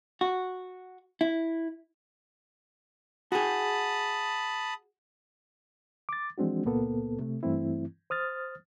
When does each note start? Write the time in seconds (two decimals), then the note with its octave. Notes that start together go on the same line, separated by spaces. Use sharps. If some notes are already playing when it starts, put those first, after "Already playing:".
0.21 F#4
1.21 E4
3.32 F#4 G#4 A5 B5 D#6
6.09 D6 A6
6.38 E3 F3 G#3 C4 D4 F#4
6.65 C#2 A#2 A#3 B3 A4
7.19 C3 A3
7.43 G2 E3 A3 C4 E4
8.10 C5 D#6 F6 A6